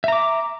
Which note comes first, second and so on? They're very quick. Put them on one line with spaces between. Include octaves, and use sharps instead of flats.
E5 A#5 D6